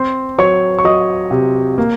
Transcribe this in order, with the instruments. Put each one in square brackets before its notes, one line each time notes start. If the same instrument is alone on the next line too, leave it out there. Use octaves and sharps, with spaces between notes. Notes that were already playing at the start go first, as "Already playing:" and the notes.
Already playing: [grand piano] C4 C5 C6
F#3 C#5 C#6
C#6
F#3 D#5 D#6
C3
A#3